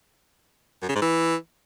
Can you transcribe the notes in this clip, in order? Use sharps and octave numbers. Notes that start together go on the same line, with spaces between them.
F#2
C#3
G#2
E3